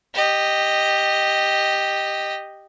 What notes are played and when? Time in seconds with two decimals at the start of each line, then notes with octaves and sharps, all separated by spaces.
0.14 G4 D#5